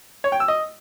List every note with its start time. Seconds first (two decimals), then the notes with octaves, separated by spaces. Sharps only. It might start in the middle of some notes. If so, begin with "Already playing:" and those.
0.24 C#5
0.32 G5
0.40 E6
0.48 D#5